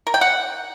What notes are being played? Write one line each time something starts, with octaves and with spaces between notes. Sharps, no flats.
A#4
G5
F#5